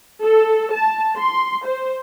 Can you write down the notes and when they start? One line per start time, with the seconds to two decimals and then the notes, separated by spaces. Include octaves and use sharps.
0.24 A4
0.74 A5
1.16 C6
1.65 C5